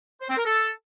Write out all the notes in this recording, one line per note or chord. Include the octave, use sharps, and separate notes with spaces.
C5
C4
A#4
A4